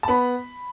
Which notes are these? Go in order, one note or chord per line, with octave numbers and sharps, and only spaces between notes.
A5
B3 B5